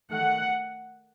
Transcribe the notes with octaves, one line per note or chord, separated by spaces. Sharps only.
D#3 A3 F#5